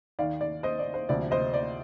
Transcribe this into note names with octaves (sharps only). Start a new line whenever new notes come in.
D#2 D#3 D5 F5
D5
C5 D#5
D5
C5
D2 C3 F3 D5
C5 D#5
D5